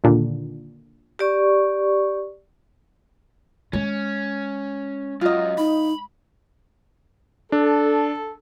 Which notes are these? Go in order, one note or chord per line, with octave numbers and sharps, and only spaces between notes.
D#2 A#2 D3
G4 D5 C#6
G#3 C#4
F#2 F4 D#5
D#4 B5
D4 A4